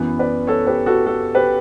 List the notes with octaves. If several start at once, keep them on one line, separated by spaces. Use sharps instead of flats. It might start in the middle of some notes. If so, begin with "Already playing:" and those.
Already playing: F#2 E3 B3
B4 D5
A4 C#5
G4 B4
F#4 A4
F#4 A4
G4 B4